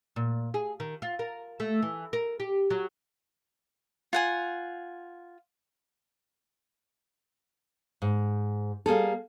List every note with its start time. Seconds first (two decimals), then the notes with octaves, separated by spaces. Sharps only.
0.16 A#2
0.54 G#4
0.80 D#3
1.02 F4
1.19 A#4
1.60 A3
1.83 E3
2.13 A#4
2.40 G4
2.70 F#3
4.13 F4 F#5 G#5
8.02 G#2
8.86 G3 A#3 G#4 A4